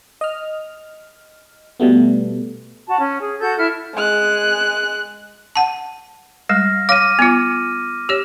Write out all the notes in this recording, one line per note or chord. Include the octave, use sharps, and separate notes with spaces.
D#5 F6
B2 G3 A3 B3
F#4 A5
C#4
G#4
F#4 A4 F#5 G6
E4 F6
G#3 F#6
F#5 A5
G3 G#3 F6 A#6
C#5 F5 D6 F6 D#7
B3 F4
G4 C#5 E7